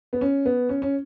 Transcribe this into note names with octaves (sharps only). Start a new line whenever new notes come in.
B3
C#4
B3
C#4
C#4